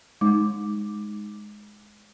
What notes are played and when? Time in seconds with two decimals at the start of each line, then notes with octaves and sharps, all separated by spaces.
0.21 G#3 D#4 D6